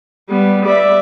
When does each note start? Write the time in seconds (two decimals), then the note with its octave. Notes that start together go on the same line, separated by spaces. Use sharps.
0.29 G3 B3
0.65 D5 E5